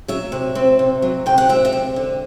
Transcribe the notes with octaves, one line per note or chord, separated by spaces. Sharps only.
F#3 E5
C3
C4
C3
F#3
C3 G5
F#5
C4 E5
E5
C3
D3